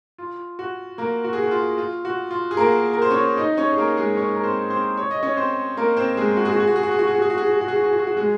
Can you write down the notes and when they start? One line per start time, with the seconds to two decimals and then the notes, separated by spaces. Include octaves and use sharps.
0.18 F4
0.59 F#4
0.98 A#3 A#4
1.24 F#4
1.33 G#4
1.42 F#4
1.51 F4
1.78 F4
2.05 F#4
2.31 F4
2.51 G#4
2.57 A#3 A#4
2.94 A#4
3.02 C5
3.10 C#4 C#5
3.37 D#4 D#5
3.57 C#4 C#5
3.71 G#4
3.78 A#3 A#4
3.97 G#3 G#4
4.17 C#4 C#5
4.36 A#4
4.44 C4 C5
4.70 C4 C5
4.98 C#5
5.11 D#5
5.23 C#4 C#5
5.37 C4 C5
5.77 A#3 A#4
5.97 C4 C5
6.17 G#3 G#4
6.37 F#4
6.45 G#4
6.52 F#4
6.60 G#4
6.67 F#4
6.76 G#4
6.83 F#4
6.91 G#4
6.99 F#4
7.07 G#4
7.15 F#4
7.22 G#4
7.30 F#4
7.38 G#4
7.46 F#4
7.53 G#4
7.61 F#4
7.68 G#4
7.76 F#4
7.84 G#4
7.93 F#4
7.99 G#4
8.07 F#4
8.16 G#3 G#4